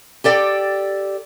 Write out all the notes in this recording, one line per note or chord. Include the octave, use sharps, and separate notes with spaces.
G4 A4 D5 G5